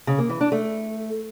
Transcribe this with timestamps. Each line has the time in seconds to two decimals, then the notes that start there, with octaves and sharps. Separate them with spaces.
0.07 C#3
0.18 A#3
0.30 E3
0.41 D4
0.52 A3